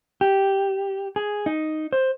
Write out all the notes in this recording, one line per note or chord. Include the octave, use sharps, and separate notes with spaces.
G4
G#4
D#4
C5